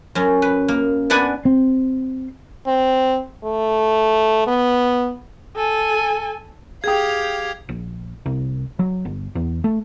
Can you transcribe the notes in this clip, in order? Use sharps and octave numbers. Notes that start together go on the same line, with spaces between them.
F#2 C#4
B4
A#3
B3 D4 B4 D5 F#5 G#5
C4
C4
A3
B3
A4 G#5
G4 G#4 F5 G5 D#6 G#6
A#1
C2
F#3
G1
E2
A3